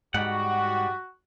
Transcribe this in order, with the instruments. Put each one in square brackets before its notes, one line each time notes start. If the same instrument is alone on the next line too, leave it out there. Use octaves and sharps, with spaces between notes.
[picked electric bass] G#2 [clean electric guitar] G3 F#5 [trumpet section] F#4